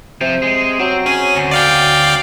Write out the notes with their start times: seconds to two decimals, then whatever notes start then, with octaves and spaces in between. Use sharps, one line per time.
0.21 C3 F3
0.42 G#3
0.79 F#3 C4
1.06 C#4 G#4
1.36 D2
1.51 D5 F5 G5